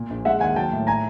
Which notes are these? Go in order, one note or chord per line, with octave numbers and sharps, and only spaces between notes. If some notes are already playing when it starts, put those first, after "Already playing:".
Already playing: A#2
A#1
G#3 E5 F#5
D#2 F#5 G#5
F#3 G5 A5
A2
G#5 A#5